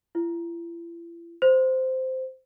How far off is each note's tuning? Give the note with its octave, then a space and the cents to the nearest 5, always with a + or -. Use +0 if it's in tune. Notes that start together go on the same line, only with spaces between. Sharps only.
E4 +45
C5 -10